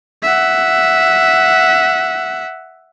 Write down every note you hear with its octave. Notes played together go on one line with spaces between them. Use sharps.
E5 F#5